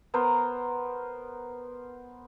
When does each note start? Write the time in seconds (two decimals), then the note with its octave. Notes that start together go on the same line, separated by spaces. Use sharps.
0.14 B3 A#4 C5 A#5